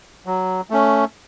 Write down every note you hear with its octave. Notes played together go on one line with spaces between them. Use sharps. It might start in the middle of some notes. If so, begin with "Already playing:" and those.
F#3
A3 C#4